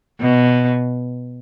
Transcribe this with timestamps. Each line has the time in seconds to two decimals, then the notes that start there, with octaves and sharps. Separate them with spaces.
0.21 B2